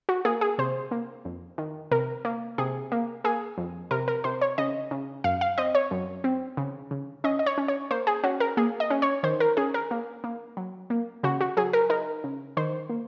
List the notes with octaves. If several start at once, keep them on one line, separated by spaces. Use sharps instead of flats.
F#4
A#3 G#4
G#4
C3 C5
A#3
F2
D#3
C3 A#4
A#3
C3 G#4
A#3
A#3 G#4
F2
C3 A#4
A#4
C3 C5
C#5
C#3 D#5
C#3
F#2 F5
F5
C4 D#5
C#5
F#2
C4
C#3
C#3
C#4 D#5
D#5
C#5
C#4
C#5
A#3 C5
G#4
C#4 F#4
A#4
A#3 G#4
D#5
C#4
C#5
D#3 C5
A#4
C#4 G#4
A#4
A#3
A#3
F#3
A#3
C#3 F#4
F#4
F#3 G#4
A#4
D#4 A#4
C#3
D#3 C5
A#3